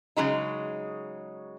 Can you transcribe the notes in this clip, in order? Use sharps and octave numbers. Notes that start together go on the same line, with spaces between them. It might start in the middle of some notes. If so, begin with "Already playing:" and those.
C#3 F#3 G#3 D#4